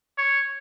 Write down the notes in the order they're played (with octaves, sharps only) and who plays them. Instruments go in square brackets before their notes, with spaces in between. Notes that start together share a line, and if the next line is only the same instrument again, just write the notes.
[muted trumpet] C#5